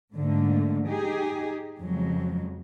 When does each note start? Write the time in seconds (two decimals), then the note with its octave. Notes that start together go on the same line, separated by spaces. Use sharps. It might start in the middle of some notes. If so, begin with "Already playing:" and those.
0.13 G#2 D3 A3 A#3
0.86 D#4 G4 G#4
1.80 F2 C#3 F#3 G#3